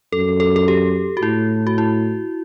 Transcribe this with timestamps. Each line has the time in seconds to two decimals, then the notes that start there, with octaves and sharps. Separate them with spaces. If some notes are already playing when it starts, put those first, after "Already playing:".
0.13 F#2 A4
0.40 A4
0.56 A4
0.68 G4
1.17 F#4
1.22 A2 E4
1.67 F#4
1.78 E4